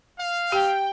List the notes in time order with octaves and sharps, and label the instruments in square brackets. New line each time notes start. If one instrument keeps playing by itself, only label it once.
[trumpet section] F5
[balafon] G4 [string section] G5